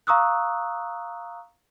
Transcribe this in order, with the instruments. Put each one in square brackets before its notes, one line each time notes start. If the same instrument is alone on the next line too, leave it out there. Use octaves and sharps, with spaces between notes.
[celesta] F5 A#5 C#6 D#6 E6 F#6